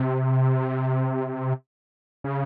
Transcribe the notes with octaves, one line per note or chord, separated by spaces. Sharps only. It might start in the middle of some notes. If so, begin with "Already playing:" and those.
Already playing: C3
C#3